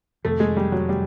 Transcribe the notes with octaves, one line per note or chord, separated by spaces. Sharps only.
F2 C3 D#3 A3
G#3
G3
F#3
G3